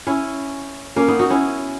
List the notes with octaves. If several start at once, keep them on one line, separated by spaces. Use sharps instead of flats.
C#4 E4
A#3 C#4
B3 D#4
D#4 F#4
C#4 E4